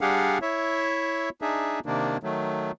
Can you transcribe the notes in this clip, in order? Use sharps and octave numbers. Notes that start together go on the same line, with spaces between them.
G3 D4 G4 G#4 F5 F#5
E4 C#5 E5
D4 D#4 G#4 E5
C3 D#3 A#3 D4
D#3 F#3 A3